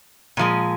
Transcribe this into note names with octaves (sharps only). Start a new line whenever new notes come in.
A#2 F3 G#3